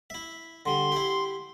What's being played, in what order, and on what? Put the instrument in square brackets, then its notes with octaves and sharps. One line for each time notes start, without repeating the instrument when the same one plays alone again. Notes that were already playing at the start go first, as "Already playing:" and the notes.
[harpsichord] E4 E5
[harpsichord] D3 G3 [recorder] C6
[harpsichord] E4 G4